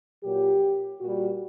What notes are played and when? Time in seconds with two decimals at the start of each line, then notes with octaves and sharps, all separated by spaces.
0.22 A#2 F#3 G4
1.00 A#2 G3 F#4